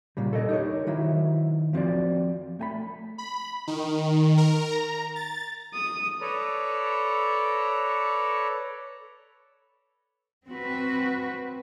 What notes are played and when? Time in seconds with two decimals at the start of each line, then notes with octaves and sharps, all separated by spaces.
0.17 A#2 C#3 G3
0.33 A4 A#4 D#5
0.49 D#4 G4 A#4 C#5
0.87 D#3 F#3 E4
1.73 F3 C4 F#4 D5
2.59 A3 G#5 B5
3.18 B5
3.67 D#3
4.38 A#4
4.72 A#5
5.16 A6
5.74 D#6
6.21 A4 B4 C#5 D5 A#5
10.47 C4 F#4 B4